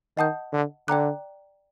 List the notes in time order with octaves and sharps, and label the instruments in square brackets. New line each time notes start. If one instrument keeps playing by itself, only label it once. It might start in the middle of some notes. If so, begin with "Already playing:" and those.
[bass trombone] D#3 [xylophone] D#5 F#5 A5 D#6 G6
[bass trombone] D3
[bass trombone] D3 [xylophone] D5 G5 A#5 D6 F#6